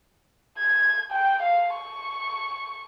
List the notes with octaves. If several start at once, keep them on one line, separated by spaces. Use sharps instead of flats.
G#6
G5
F5
C#6